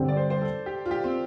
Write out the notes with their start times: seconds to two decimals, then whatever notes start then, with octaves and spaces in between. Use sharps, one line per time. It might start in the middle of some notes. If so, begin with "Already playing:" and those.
Already playing: G2 D3 G3 C4
0.08 D5
0.17 C5
0.30 C5
0.42 A4
0.66 G4
0.86 F4
0.91 G4
1.04 C4